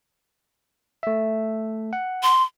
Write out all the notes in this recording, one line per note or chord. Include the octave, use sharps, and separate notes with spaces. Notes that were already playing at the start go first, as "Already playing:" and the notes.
A3 E5
F#5
C6